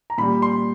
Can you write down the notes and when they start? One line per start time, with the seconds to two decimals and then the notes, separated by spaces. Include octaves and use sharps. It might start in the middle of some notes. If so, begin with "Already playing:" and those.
0.10 A#5
0.18 A#2 G3 B5
0.42 C6